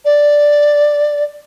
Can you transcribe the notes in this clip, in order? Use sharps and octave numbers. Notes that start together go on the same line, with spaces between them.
D5